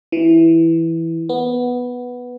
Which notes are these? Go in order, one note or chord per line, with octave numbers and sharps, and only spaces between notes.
E3
B3